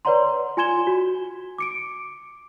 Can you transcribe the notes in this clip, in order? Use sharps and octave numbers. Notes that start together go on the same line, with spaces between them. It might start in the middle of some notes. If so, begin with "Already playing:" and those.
B4 C#5 D5 F#5 A#5 C6
F4 G#5 C6 G#6 E7 G7
F#4
D6 C#7 D7